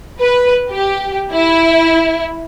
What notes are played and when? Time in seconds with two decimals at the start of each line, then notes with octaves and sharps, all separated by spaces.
0.20 B4
0.70 G4
1.32 E4